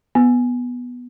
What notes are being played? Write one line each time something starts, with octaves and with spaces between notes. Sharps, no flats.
B3